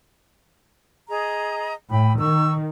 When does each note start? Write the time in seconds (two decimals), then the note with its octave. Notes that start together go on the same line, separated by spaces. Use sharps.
1.09 G#4 D#5 A#5
1.90 A2 G5 B5
2.19 D#3 C#6 E6